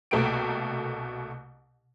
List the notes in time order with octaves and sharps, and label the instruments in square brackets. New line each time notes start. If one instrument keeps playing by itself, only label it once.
[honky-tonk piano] C2 B2 A3 A#3 G5 D7